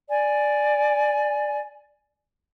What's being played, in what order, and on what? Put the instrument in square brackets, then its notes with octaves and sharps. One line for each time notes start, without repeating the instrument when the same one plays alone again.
[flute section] D5 G#5